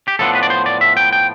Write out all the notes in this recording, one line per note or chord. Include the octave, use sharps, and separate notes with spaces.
G4
A2 F3 B3 D4 A4
B4
D5
C5
D5
E5
G5
G5